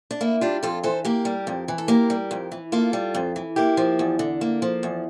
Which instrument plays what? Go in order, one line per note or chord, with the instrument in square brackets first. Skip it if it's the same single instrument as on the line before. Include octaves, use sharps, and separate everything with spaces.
[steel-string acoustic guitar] D4
A#3 E4
G3 D4 F4
F2 F4 A4
E3 A4 C5
A#3 G4 A#4
G3
F2
E3
A4
A#3 G4 A#4
G3
F2
E3
A#3 F4 A4
G3
F2
E3
A#3 E4 G4
F3
E2
D3
A#3
F3
E2